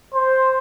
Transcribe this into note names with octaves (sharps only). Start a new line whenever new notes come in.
C5